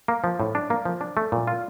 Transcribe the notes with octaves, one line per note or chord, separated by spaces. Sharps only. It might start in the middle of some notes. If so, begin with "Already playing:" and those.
A#3
F3
A2
D4
A#3
F3
D4
A3
A#2
F4